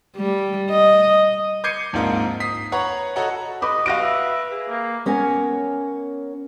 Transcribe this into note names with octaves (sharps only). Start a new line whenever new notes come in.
G3
D#5
D6 G6 G#6 C7 C#7 D#7
A#1 G#2 C4 D#4 F4 A#4
D#6 B6 C7
B4 C#5 F#5 A#5 B5 C#6
F#4 A4 C#5 D#5 F#5 A#5
B4 D#5 B5 D6
F#4 F5 A#6 D7
E5
G#4
A#3
B3 C#4 A#4 C#5 G#5